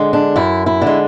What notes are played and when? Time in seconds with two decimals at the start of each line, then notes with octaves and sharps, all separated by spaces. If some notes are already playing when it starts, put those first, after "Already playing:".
Already playing: D3 G#3
0.13 D4
0.36 F#2 E4
0.66 E4
0.82 D3
0.87 G#3